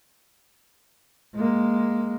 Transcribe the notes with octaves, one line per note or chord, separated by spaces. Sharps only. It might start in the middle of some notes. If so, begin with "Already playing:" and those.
G#3 A#3